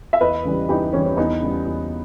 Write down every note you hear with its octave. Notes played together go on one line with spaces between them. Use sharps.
E5
E2 B4 D#5
C#3 E3 G3
E2 D#4 G4
C#3 E3 G3 C#4
C#4
E2 B3 D#4
C#3 G3
E2